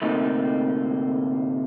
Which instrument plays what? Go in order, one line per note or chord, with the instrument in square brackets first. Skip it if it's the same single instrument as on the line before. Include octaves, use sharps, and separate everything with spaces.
[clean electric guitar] D2 A2 C3 A#3 D#4